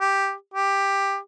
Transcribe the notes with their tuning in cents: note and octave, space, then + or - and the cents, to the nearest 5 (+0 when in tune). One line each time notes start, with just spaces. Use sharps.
G4 +0
G4 +10